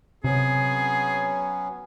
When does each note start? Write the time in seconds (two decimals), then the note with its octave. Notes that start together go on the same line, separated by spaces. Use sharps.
0.24 C3 F#3 B3 C#4 G#4